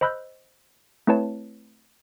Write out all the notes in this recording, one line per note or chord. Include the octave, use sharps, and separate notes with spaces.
C5 D#5 B5 E6 F#6 G6
A3 C4 E4 B4 C#5 A5